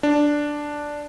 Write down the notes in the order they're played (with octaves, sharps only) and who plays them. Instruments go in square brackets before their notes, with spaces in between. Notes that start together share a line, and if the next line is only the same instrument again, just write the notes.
[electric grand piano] D4